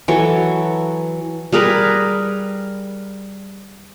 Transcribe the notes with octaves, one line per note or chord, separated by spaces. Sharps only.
E3 F#3 A4 C#5
G3 G#4 A#4 B4